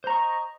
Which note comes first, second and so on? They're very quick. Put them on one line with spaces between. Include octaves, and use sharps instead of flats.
C5 A#5 C#6 D#5